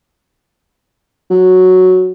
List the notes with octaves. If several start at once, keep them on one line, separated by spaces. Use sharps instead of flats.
F#3